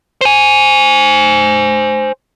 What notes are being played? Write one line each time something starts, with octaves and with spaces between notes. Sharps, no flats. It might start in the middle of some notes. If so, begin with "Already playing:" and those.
C5 G#5